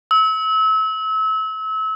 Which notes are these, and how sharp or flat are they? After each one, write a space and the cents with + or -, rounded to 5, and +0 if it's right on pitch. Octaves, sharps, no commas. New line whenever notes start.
E6 -30